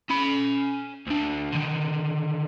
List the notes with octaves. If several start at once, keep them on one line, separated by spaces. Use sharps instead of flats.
C#4 B5
D2 D4
D3 D#3